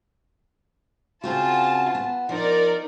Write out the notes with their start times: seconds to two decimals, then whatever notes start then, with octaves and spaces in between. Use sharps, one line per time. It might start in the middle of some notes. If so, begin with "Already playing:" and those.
1.24 C#3 C4 F4 F#4 G#5 A5
1.95 B3
2.29 F3 D#4 A#4 D5